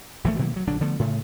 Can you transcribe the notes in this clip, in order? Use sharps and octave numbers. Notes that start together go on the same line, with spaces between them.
A#1 E3 F3 A3
B2 D#3 F#3 A#3
D2 F#3
A#1 D3 F#3 D4
D3 F3 A3 B3
A2 C#3 A3